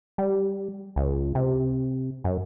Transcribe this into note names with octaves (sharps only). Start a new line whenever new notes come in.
G3
C#2
C3
F#2